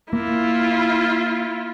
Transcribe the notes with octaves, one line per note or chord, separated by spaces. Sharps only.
A#3 E4 F4